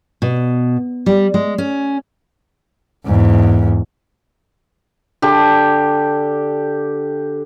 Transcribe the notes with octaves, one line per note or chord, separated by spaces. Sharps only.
B2
G3
G#3
C#4
E2 G#2
D3 G4